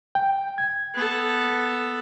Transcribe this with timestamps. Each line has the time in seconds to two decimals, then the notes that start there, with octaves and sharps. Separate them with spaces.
0.15 G5
0.58 G#6
0.94 B3 A4